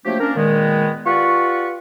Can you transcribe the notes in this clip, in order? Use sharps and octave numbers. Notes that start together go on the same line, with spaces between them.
F3 F#3 A3 A#3 D4 G4
A#3 C#4 D4 A#4
A#2 D#3 G#3 B3
F4 G4 B4 D5 F#5 C#6